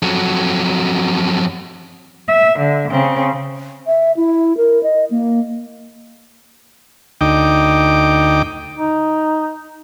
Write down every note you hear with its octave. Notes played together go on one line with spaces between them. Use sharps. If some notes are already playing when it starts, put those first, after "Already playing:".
F2 F#3
E5
D3
C#3 C4
E5
E4
A#4
D#5
A#3
D2 D#4 G5 D6
D#4